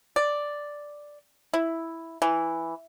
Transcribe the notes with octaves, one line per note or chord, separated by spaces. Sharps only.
D5
E4
E3